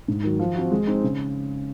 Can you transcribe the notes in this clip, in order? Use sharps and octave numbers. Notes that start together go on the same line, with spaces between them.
G#2
D#3 F#3
F3
C4 F#4
G#3
C4 D#4
C#3